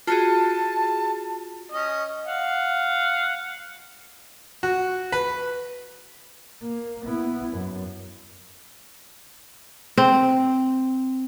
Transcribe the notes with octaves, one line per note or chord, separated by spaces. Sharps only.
F4 F#4 G#4 A5
C#4 D#5
F5 F#5
F#4
B4
A#3
B3 E4
F#2
C4